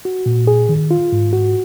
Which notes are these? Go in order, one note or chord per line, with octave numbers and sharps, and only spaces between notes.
F#4
A#2
G#4
D#3
F4
G#2
F#4